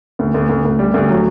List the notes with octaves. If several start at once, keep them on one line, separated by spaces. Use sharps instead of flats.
D2
D2
D2
D2
G3
D2
F#3